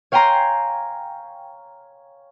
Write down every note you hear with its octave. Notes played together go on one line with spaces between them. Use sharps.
C#5 F5 G5 G#5 A#5 C6